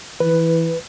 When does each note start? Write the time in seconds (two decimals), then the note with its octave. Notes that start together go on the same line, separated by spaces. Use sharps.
0.20 E3 B4